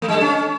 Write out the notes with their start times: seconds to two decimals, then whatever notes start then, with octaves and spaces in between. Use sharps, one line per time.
0.02 A3
0.08 G3
0.15 A4
0.21 C#4